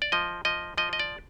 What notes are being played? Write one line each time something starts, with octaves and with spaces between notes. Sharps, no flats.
D5
F3 D#5
F3 D#5
F3 D#5
D#5
D5